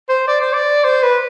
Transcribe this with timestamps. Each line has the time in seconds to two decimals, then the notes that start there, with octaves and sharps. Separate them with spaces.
0.09 C5
0.28 D5
0.41 C5
0.53 D5
0.84 C5
1.03 B4